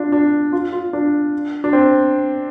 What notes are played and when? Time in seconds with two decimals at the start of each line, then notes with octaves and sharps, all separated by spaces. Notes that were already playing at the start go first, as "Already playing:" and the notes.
Already playing: D4 F4
0.12 D4
0.52 F4
0.73 F4
0.93 D4
1.64 D4
1.73 C4